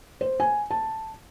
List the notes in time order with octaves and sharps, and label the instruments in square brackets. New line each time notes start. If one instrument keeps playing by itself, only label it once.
[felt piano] C5
G#5
A5